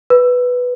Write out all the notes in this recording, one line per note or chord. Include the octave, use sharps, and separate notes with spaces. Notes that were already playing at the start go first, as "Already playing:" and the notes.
B4